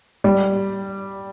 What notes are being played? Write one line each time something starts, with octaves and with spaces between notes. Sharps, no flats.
G3